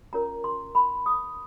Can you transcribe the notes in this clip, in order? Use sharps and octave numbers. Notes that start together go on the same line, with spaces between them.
C#4 F4 A#4 C#5 A#5
C6
B5
D#6